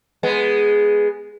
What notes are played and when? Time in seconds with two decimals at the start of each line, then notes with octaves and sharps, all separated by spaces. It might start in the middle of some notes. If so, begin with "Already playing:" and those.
0.23 G#3 B3